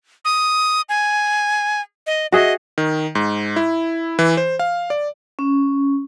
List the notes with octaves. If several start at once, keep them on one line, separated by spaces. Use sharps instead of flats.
D#6
G#5
D#5
F#4 G#4 D#5 E5
D#3
G#2
E4
E3
C5
F5
D5
C#4